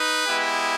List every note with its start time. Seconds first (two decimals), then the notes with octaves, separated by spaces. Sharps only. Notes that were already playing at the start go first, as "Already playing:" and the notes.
Already playing: D#4 B4
0.27 G#3 B3 E4 G4